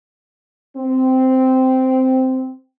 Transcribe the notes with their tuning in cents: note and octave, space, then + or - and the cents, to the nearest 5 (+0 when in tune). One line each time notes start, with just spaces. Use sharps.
C4 -10